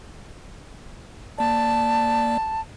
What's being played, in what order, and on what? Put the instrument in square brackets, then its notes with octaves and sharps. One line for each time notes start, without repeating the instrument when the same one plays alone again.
[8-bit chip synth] A#3 D5 [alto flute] A5